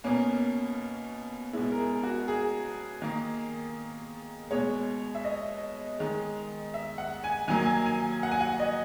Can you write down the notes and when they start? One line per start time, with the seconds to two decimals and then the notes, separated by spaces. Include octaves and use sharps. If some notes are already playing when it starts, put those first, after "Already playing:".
0.04 B2 A#3 C#4
1.53 B2 G#3 E4
1.72 A#4
1.78 G#4
2.03 F#4
2.28 G#4
3.02 D#3 A#3
4.51 B2 G#3 C#5
5.15 E5
5.24 D#5
5.99 D#3 G#3
6.74 E5
6.98 F#5
7.24 G#5
7.48 D#3 F#3 A#3 G#5
7.66 G#5
7.86 G#5
8.23 F#5
8.31 G#5
8.41 F#5
8.60 D#5